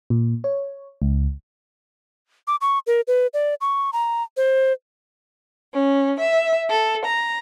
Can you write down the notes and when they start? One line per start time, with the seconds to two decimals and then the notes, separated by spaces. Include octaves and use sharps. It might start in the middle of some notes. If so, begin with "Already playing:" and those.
0.10 A#2
0.44 C#5
1.02 C#2
2.47 D6
2.61 C#6
2.87 A#4
3.08 B4
3.34 D5
3.61 C#6
3.93 A#5
4.37 C5
5.73 C#4
6.18 E5
6.68 A4
7.04 A#5